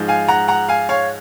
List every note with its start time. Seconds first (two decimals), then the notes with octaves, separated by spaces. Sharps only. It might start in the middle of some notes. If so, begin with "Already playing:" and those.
Already playing: G#2 F3 G#3
0.08 F5 G#5
0.28 F#5 A#5
0.48 F#5 A#5
0.68 F5 G#5
0.89 C#5 F5